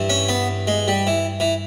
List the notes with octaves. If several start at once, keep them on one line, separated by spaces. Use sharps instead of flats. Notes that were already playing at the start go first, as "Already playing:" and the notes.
Already playing: G2 E3
C#4
B3
G#3
G3
E3
E3